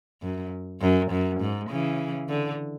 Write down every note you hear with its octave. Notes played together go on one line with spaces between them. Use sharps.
F#2
F#2
F#2
G#2
C#3 E3
D3